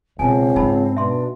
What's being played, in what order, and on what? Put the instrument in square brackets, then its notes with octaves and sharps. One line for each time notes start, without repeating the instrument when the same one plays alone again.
[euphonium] C#2 [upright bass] B2 [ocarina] C4 [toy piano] G#5 A5
[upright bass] G#2 [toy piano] D#4 A5 B5
[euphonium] B2 [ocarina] D4 [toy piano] E5 C6